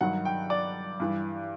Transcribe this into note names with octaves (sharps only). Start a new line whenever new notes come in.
G2 D#3 F#3 F#5
G5
D5
G2 E3